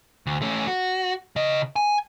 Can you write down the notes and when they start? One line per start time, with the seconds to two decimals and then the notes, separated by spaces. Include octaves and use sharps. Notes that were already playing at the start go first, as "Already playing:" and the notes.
0.26 D2
0.42 A3 C#4
0.67 F#4
1.36 C#3 D#5
1.76 G#5